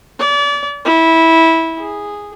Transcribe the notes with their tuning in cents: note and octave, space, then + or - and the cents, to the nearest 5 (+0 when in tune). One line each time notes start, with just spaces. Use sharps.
D5 -35
E4 -15
G#4 -10